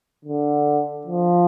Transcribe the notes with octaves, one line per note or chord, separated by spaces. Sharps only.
D3
F3